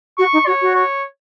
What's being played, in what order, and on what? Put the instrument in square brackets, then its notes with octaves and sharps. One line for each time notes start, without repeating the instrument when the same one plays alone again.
[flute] F#4 [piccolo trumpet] C#6
[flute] D#4
[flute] F#4 [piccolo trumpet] C#5
[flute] F#4
[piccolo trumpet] C#5